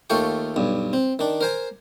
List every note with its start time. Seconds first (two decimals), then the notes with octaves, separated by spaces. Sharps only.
0.10 D#2 A3 F4 A4 G5 C#6
0.56 B1 G2
0.93 C4
1.19 D#3 D4
1.41 A#4 C5 G#5